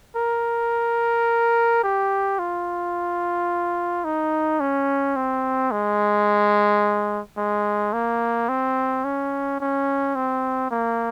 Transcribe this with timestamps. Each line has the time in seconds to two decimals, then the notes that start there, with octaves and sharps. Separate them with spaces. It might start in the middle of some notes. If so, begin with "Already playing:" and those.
0.17 A#4
1.84 G4
2.39 F4
4.05 D#4
4.60 C#4
5.16 C4
5.72 G#3
7.38 G#3
7.93 A#3
8.49 C4
9.05 C#4
9.61 C#4
10.16 C4
10.71 A#3